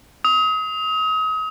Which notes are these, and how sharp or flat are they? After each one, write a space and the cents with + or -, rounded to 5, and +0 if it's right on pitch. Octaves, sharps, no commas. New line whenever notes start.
D#6 +35